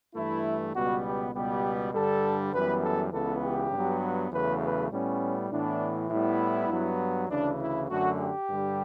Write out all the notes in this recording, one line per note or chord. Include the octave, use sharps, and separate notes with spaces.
G2 E3 A3 E4
C#2 B2 G3 B3 F#4
G4
C#2 B2 G3 B3 G4
G2 D3 G3 A4
F#2 E3 G3 B3 B4
A4
C#2 C#3 E3 B3 A4
G4
G2 F#3 B3
E2 C#3 F#3 A3 B4
B4
A2 G3 B3 C#4
A2 E3 B3 D4
A2 G3 B3 E4
G2 F#3 B3
D2 C#3 E3 D4
E4
F#2 D3 A3 F#4
G4
G2 D3 G3